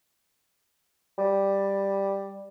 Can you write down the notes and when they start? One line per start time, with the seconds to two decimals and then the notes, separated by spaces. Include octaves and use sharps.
1.18 G3